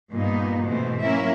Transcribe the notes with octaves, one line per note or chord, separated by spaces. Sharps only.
G2 A#2 A#3 B3 D#4
G#2 B2 E3 G#3 A3 C4
F#3 A#3 C#4 E4 A#4 E5